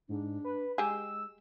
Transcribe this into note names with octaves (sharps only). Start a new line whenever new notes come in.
G#2 D4
B4
G#3 G4 G#4 E6